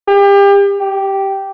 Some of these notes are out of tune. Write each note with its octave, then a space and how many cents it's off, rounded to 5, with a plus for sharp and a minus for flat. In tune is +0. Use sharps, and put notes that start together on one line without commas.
G4 +30
G4 -10